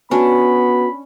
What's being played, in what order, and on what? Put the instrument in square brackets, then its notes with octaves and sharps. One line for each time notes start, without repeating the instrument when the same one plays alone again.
[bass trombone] B3 [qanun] C#4 D4 [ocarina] F#4 [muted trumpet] B5